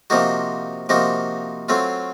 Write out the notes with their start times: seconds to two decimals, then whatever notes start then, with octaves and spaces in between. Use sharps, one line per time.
0.10 C3 F3 A#3 D#4 F#4
0.89 C3 F3 A#3 D#4 F#4
1.69 F#3 A3 C4 F4